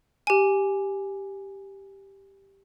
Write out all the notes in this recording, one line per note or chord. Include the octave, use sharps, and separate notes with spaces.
G4 G#5